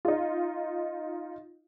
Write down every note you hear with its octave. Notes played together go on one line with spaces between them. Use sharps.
D#4 F4